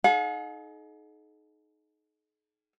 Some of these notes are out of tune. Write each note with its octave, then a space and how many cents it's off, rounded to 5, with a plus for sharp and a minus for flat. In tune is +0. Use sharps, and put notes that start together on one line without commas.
D#4 +0 G#4 +45 F#5 -45